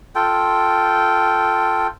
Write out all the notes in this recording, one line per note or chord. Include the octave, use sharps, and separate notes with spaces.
F4 A4 G5